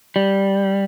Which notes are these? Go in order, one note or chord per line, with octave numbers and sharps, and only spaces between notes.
G3